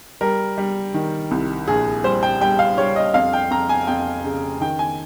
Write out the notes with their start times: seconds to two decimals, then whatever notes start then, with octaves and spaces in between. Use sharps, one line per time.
0.21 G3 A#4
0.58 G3
0.94 D#3
1.31 C2
1.68 A#1 G#4
2.04 G3 C5
2.23 G5
2.41 G3 G5
2.59 F5
2.78 G3 C#5
2.96 D#5
3.14 F2 F5
3.33 G5
3.51 F2 A#5
3.69 G#5
3.87 F2 G5
4.24 C#3
4.61 D#3 G5
4.79 G#5